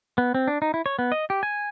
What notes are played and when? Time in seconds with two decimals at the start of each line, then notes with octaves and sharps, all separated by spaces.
0.18 B3
0.34 C4
0.48 D4
0.62 D#4
0.74 E4
0.86 C#5
0.99 B3
1.12 D#5
1.30 G4
1.43 G#5